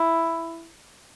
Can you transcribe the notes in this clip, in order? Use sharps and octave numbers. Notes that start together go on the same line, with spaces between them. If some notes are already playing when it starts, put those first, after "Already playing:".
Already playing: E4